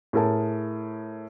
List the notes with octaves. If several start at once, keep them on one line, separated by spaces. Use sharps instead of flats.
A2 G#4 A#4 A5